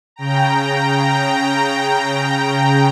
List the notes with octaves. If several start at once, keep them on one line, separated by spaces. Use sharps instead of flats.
C#3 G5 A#5